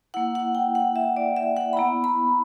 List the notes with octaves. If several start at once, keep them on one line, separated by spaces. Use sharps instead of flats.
A#3 E4 F#5
F#5
G5
F#5
E5
D5
E5
F#5
B5
B3 E4 A#5
B5